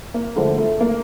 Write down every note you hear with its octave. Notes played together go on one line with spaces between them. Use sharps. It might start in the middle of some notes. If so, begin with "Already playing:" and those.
A#3
D3 F3 G#3 A3
A3
A#3